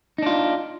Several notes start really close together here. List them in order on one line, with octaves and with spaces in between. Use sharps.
D#4 D4 F4